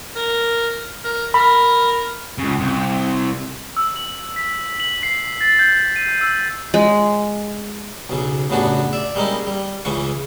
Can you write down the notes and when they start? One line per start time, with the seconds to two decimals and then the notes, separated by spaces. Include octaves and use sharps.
0.16 A#4
1.04 A#4
1.34 A#4 B5
2.38 C#2 C#3
2.60 C2
3.77 E6
3.96 F#7
4.36 B6
4.80 F#7
5.03 C7
5.41 A6
5.59 G6
5.96 D#7
6.21 E6
6.74 G#3
8.10 B1 C#3
8.50 A1 F#2 C#3 B3 D4 F#4
8.93 D5 E5
9.16 G3 G#3 A#3 C#4 D#4 E4
9.47 G3
9.85 C#2 C#3 E3 C#4 C#6